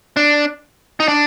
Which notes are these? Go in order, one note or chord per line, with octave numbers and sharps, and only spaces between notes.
D4
D#4
D4